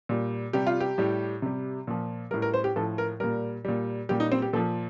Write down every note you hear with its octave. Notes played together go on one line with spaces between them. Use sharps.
A#2 G3
C3 G3 G4
F4
G4
A2 G3
C3 G3
A#2 F3
A2 G3 A#4
A#4
C5
G4
A2 F3 A4
A#4
A#2 G3 A#4
A#2 G3
A#2 G3 G4
D#4
C4
G4
A#2 F3 A4